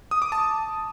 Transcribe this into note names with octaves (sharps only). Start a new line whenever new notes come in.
D#6
D6
A5